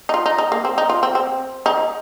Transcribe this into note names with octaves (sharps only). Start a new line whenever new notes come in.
D#4
F4
D#4
D#4
A#3
C4
D#4
F4
C4
C4
D#4